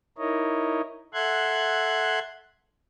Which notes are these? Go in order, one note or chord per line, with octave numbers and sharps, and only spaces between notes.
D#4 E4 A#4 C#5 D#5
A4 E5 F#5 C6 F#6 G#6